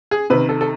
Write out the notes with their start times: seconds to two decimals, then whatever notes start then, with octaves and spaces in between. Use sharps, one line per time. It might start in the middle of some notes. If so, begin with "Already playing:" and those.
0.11 G#4
0.30 C3 D#3 B4
0.49 A4
0.61 A4